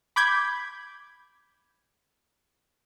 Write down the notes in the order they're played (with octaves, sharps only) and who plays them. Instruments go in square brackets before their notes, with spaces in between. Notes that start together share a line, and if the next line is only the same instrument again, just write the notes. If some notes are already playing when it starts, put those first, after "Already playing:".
[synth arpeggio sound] B5 D6 G6 G#6 B6